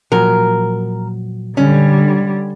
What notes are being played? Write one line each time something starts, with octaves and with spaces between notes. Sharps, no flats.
A#2 F3 F#3 A#4
D3 G3 C#4